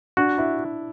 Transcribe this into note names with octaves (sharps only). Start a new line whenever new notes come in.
D4 F#4
E4